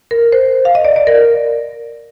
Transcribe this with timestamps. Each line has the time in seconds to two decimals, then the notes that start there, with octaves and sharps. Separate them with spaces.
0.11 A#4
0.32 C5
0.65 F5
0.75 D#5
0.85 D5
0.96 D5
1.07 A#4